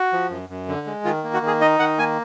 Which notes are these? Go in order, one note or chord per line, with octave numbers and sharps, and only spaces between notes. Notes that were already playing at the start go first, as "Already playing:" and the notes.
Already playing: F#4
F3
F#2
F#2
D3
G#3
D#3 F4
A#3
F#4
D#3
G#4
D#4 D#5
D#3 F#5
A#3 G#5